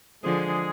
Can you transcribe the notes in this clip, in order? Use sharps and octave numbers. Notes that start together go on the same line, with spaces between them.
D3 F3 G#3 G#4